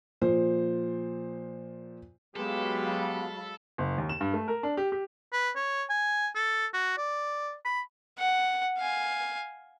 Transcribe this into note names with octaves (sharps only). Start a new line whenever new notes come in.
A#2 F3 C5
F#3 G#3 B3 G4 A4 F5 B5
F#1
D#2
E7
G2
A3
A#4
D4
G4
G4
B4
C#5
G#5
A4
F#4
D5
B5
F#5
F5 G#5